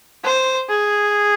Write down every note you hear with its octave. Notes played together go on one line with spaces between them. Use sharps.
C5
G#4